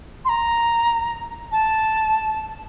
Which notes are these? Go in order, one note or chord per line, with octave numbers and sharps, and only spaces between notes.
C6
A#5
A5